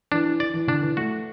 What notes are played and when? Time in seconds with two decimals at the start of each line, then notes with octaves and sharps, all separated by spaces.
0.12 E3 D4
0.40 D5
0.54 E3
0.67 D3 D4
0.81 E3
0.97 A3 F#4